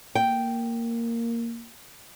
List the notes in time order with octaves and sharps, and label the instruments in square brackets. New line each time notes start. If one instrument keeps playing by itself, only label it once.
[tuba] A#3 [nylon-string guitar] G5